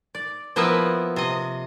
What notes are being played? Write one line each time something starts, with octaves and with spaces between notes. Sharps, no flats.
D5
F3 A#3 B3 E4 B4 E5
C3 D#5